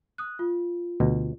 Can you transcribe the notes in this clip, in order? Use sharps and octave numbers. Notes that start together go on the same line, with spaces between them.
D#6 F#6
F4
D2 B2